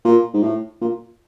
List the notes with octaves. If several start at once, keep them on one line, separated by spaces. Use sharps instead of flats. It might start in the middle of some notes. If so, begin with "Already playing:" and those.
A#2
G#2
A2
A#2